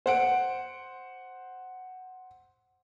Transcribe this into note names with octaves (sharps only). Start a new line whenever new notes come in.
C5 F#5 D7